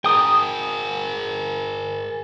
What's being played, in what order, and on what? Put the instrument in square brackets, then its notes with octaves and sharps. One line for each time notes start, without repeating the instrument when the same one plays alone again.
[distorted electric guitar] G#4 A#4 [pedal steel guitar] G5 D#6